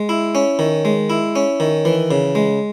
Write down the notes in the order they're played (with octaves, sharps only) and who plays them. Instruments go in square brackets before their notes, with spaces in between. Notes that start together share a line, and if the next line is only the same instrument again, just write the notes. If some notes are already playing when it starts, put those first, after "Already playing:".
Already playing: [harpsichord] G#3
E4
C#4
D#3
G#3
E4
C#4
D#3
E3
C#3
G#3